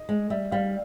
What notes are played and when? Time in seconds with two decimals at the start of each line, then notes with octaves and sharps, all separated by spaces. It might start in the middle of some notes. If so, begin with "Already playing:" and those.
Already playing: D#5
0.09 G#3
0.30 G3 E5
0.51 G3 F5